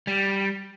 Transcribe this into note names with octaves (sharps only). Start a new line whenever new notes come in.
G3